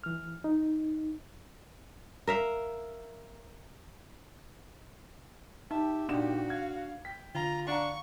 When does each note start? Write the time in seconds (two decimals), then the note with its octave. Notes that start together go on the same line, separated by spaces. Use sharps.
0.04 E3 F6
0.44 D#4
2.27 A#4 E5 F5
5.71 D#4 G4 E5 A5
6.09 A#2 D4 D#4 F#4 E7
6.48 F5 F#5 G#6
7.05 G5 B6
7.35 D3 F4 A#5
7.67 D4 F5 F#5 A#5 C#6